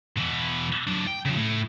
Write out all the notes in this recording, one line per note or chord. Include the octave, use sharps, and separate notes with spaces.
B2 E3
F#3 D4
G5
C#3 F3
A2